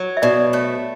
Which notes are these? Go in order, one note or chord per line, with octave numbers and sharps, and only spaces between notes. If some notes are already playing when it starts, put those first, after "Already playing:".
Already playing: F#3
E5
B2 D5
A3 C#5